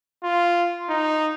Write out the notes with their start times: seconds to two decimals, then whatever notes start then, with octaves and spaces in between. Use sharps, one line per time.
0.23 F4
0.89 D#4